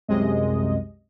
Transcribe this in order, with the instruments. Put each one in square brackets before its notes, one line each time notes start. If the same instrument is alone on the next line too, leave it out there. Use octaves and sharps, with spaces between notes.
[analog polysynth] C2 F#2 C3 G#3 D#5